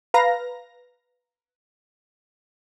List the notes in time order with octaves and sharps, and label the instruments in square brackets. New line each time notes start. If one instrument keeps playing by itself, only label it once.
[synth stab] B4 F5 A#5 A#6